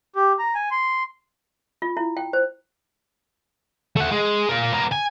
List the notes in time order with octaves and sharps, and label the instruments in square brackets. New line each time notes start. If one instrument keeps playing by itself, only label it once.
[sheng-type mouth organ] G4
A#5
G#5
C6
[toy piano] F4
E4
G5
C5
[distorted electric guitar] A3 F#5
G#3
F4 A#4
B3 A#4
G#5